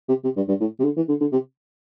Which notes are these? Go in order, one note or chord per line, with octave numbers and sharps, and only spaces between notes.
C3
C3
G2
G2
A2
C3
D3
E3
D3
D3
C3